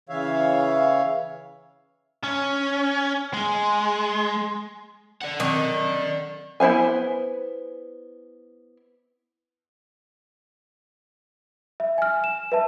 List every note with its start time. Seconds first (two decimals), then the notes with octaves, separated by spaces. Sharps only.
0.09 C#3 E3 C#5 E5 F5
2.23 C#4
3.34 G#3
5.21 D5 F#5
5.40 D#3 F#3 C4
6.60 B3 E4 C5 F5 G#5
11.80 E5
11.98 G#5 F6
12.24 E7
12.52 B4 E5 A5